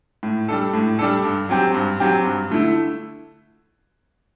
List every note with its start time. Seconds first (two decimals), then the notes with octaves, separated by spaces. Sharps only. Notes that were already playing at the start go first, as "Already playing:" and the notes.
0.23 A2
0.48 G3 D4 A4
0.74 A2
0.99 G3 D4 A4
1.24 G2
1.49 F#3 C4 G4
1.75 G2
2.00 F#3 C4 G4
2.25 G2
2.51 D3 A3 E4